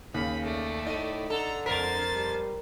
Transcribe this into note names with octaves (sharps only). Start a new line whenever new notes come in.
D#2 C#3 F5 B5
A3 D5
A2 D#4 D#7
D3 A4 A#5
F2 A#4 C5 A6 B6
G3